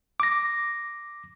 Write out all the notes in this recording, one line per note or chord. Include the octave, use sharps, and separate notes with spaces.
D6 A#6